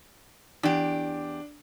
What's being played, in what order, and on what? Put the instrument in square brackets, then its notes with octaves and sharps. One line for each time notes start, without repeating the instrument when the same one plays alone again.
[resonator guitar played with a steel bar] E2 G4 [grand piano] D4